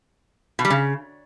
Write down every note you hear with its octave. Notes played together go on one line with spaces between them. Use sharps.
B2
G3
C#3